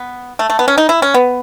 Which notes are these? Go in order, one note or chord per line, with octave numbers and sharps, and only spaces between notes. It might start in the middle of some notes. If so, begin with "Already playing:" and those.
Already playing: B3
A3
A3
B3
C#4
D#4
E4
C#4
B3